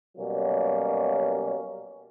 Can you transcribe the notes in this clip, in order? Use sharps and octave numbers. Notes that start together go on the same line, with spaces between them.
B2 F#3 G3 A#3 C#4